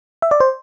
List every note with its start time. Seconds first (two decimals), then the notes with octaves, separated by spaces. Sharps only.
0.22 E5
0.31 D5
0.40 C5